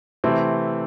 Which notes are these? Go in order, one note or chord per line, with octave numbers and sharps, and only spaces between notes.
C3 E3 A3 C4